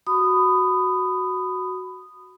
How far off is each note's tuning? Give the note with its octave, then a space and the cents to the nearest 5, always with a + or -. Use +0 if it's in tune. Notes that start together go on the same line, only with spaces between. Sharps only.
F#4 +0 B5 +20 D#6 -10